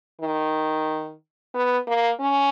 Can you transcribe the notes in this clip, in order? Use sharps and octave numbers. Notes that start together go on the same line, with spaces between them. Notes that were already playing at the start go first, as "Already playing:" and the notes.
D#3
B3
A#3
C#4